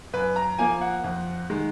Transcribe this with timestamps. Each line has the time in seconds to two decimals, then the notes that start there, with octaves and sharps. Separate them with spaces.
0.13 F#2 B4
0.36 A#5
0.58 F3 A#3 G#5
0.81 F#5
1.04 F2
1.50 D#3 G#3